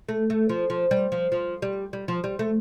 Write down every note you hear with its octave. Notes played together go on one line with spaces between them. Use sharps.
A3
A3
F3
F3
G3
F3
F3
G3
G3
F3
G3
A3